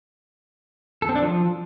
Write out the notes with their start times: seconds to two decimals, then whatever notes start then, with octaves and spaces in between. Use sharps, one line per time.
1.02 A4
1.09 C4
1.16 D4
1.22 F3